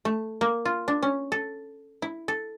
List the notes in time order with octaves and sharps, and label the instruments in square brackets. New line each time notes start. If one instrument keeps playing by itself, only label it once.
[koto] A3
A#3
F4
D4
C#4
A4
E4
A4